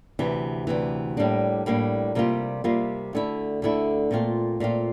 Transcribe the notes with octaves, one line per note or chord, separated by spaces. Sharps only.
D2 C3 E3
D2 C3 E3
A2 G3 A#3 D4
A2 G3 A#3 D4
C3 G3 A#3 F4
C3 G3 A#3 F4
D2 D3 A3 E4
D2 D3 A3 E4
A#2 A3 C4 F4
A#2 A3 C4 F4